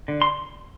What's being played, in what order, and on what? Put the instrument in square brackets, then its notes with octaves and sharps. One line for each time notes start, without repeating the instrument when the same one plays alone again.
[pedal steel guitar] D3
C6